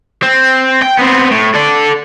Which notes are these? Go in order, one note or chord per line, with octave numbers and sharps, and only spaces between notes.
C4
G5
B3 C4
A2
A4 D5